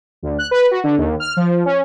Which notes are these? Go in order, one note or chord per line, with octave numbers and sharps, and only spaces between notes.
D2
F#6
B4
F#4
D3
D#2
F6
F3
C#4